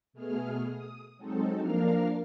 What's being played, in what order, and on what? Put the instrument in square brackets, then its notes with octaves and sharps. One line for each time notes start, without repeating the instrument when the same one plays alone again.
[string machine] B2 A3 B3 G#4 F6
D#6
F#3 G#3 C4 D#4 A4
F3 A#3 D4 A#4 F5 F6